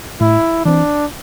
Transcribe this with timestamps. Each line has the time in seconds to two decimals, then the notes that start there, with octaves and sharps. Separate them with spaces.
0.21 A2 E4
0.65 E3 C4 D4